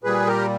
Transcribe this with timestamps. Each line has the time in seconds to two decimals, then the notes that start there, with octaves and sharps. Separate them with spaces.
0.03 A#2 G3 G#4 B4
0.27 G4 A#4